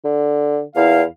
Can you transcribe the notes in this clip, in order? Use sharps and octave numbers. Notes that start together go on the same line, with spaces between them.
D3
E2 A#2 E4 F5